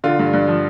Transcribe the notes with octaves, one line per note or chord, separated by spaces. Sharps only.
D3 F4
G2
G2
F3